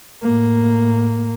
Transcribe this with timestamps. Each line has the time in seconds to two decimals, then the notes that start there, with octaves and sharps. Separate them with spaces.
0.23 A2 A#3